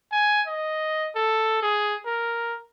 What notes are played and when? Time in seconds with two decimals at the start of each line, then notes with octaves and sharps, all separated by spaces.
0.12 G#5
0.47 D#5
1.16 A4
1.62 G#4
2.06 A#4